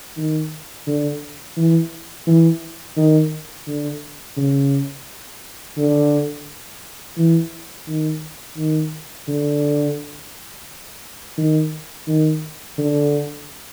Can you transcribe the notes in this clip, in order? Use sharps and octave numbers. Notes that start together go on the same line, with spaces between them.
D#3
D3
E3
E3
D#3
D3
C#3
D3
E3
D#3
D#3
D3
D#3
D#3
D3